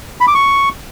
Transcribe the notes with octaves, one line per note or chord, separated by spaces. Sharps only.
B5
D6
C#6